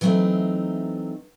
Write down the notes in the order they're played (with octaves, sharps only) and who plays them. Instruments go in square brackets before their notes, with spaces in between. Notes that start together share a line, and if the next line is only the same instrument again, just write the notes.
[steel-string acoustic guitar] E3 F#3 G3 A3 C4 D#4